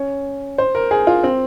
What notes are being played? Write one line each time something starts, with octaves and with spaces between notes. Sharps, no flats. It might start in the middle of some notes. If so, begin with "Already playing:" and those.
Already playing: C#4
C5
A#4
G#4
F4
C4